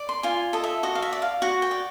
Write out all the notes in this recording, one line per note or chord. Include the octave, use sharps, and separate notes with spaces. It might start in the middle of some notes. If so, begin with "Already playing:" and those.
Already playing: D5
C6
F4 G#5
A4 D#5
E5
F#4 D#5
F5
E5
D5
F5
F#4 F#5
G5
D5